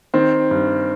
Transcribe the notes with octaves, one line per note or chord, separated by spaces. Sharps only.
D#3 C4
G2